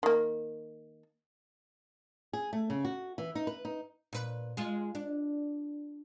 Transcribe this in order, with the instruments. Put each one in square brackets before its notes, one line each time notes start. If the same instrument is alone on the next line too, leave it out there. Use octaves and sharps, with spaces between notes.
[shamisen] D#3 A#3
[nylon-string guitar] G#4
A3
C#3
F#4
E3
D#4
B4
D#4
[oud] A#2 B4
G#3 F4
D4